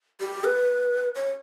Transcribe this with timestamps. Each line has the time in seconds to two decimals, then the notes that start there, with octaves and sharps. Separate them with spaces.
0.20 G4
0.44 B4
1.15 C#5